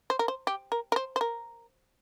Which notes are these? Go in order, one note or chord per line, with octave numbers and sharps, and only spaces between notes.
C5
A#4
C5
G4
A#4
A#4
C5
C5
A#4